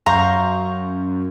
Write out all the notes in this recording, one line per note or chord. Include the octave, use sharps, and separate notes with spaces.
F#2 F5 A#5 C6 C#6 G6